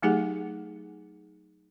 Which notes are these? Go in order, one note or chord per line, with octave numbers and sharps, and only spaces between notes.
F#3 A3 D#4 G4 G#4 F#5